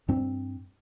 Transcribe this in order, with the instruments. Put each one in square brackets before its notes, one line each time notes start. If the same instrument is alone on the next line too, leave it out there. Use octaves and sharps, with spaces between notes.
[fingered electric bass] G2 C4